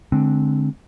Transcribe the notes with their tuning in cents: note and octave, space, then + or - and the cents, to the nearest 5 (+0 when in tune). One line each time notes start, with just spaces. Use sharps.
D3 +0 G#3 +25 C4 +0